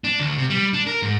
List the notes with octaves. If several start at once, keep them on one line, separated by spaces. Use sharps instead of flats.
D4
D2
C3
G3
D4
A#4
G#2